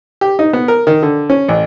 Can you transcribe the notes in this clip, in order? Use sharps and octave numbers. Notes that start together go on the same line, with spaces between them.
G4
D#4
B3
A#4
D#3
D3
C#4
A1